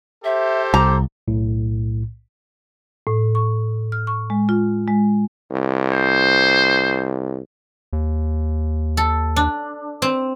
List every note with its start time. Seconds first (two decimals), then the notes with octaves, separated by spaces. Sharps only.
0.24 G4 A4 C5 E5
0.74 C2 A#5 D6
1.28 B1 A2
3.07 A2
3.35 C#6
3.92 F6
4.07 C#6
4.30 G#3
4.49 F4
4.88 G#3
5.51 C2
5.92 C5
7.93 D#2
8.97 A4
9.36 D4
10.02 C4